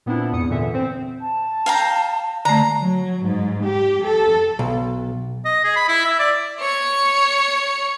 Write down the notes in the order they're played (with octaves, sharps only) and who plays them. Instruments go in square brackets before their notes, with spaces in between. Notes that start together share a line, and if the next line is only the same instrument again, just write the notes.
[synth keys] A#2 B3 C4 D4 E4
E2 G#2 D#6 C#7
A#2 D3 E3 E5
C4 C5
[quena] A5
[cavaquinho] F5 G5 A#5
[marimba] D3 A3 [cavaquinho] A#5
[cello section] F#3
G#2
G4
A4
[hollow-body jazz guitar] B1
[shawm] D#5
G#4
B5
E4
E5
D5
[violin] C#5 C#7